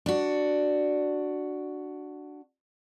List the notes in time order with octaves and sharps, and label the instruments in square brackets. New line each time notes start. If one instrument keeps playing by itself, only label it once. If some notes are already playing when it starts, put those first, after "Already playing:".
[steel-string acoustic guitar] D4 F#4